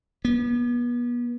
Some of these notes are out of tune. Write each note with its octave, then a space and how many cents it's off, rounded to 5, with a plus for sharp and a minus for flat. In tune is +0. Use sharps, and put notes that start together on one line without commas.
B3 -35